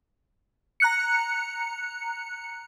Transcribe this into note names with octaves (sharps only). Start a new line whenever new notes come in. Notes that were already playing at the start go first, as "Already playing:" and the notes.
A#5 F#6 C#7